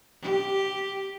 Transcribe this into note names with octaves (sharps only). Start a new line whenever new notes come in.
G4